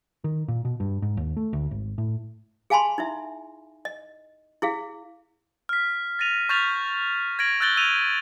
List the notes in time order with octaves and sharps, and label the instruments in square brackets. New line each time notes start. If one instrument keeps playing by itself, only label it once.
[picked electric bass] D#3
A#2
B2
G2
G#2
D#2
A3
D2
G#1
A2
[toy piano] G#4 F5 G#5 A5 B5 C6
D#4 E4 E5
D#5
E4 G#4 F5
[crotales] F6 B6
A6 A#6 D#7 F7
C#6 F6 G6 A6 B6 F7
G#6 A#6 D7 F#7
E6 F#6 G6 A6 F#7 G7
E6 D#7 F7